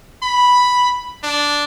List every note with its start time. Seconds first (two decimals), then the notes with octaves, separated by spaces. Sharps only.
0.23 B5
1.24 D4